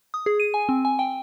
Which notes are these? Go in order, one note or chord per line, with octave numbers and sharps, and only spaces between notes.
D#6
G#4
D#7
G#5
C4
G#5
G5